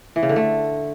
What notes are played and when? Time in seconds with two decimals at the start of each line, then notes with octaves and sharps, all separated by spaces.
0.16 E3
0.23 C#3
0.29 D3
0.36 A3